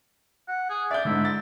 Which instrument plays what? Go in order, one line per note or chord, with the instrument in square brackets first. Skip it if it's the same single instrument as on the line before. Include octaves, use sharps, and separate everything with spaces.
[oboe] F#5
G#4
[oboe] D5 [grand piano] E5 G6
[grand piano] G#2 D3 [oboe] E4
[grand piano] A6